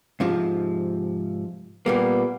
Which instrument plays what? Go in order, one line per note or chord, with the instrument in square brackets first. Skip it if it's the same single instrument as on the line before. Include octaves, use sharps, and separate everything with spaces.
[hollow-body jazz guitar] G#2 C3 F3
[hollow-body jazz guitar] A#2 G3 A#3 [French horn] B3